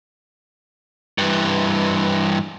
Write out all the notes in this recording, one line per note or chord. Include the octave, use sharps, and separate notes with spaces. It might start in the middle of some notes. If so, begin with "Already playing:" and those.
G2 E3